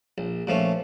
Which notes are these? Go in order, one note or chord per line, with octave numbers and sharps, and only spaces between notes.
A#1
A#2 F3 A3 C#4